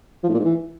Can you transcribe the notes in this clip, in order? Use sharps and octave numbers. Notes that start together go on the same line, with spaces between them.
F3
A2
A#2
G#2
E3